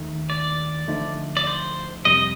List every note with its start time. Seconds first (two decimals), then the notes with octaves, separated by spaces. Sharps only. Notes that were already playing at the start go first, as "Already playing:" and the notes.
Already playing: D#2 D#3 A3
0.30 D5
0.88 D2 D3 F3 A3 D#4
1.37 D5
1.47 C5
2.05 F2 C3 G3 A#3 D#5